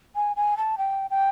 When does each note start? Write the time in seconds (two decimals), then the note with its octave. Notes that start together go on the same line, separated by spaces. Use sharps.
0.15 G#5
0.36 G#5
0.57 A5
0.78 G5
1.10 G5